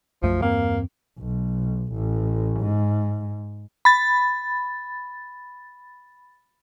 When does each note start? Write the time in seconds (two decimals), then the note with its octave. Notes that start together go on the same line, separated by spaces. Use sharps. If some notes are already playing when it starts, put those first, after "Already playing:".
0.23 B1 F#2 F3 A3
0.42 E2 G2 A#3 C4
1.18 B1
1.93 A1
2.60 G#2
3.85 B5 A6